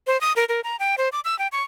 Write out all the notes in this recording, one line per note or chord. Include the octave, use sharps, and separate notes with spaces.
C5
D#6
A#4
A#4
A#5
G5
C5
D6
E6
G5
C#6